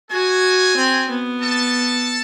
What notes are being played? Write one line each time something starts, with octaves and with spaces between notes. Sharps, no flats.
F#4 G#4 G#5
C4
B3
A4 A5